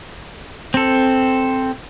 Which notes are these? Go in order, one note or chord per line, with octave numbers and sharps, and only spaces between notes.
C4 A4